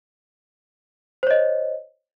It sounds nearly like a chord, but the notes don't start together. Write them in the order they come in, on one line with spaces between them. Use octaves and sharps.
C5 C#5 D#5